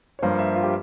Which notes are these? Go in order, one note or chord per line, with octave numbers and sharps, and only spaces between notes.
C#5
G2 F3 A#3 C5
E5
F4
G4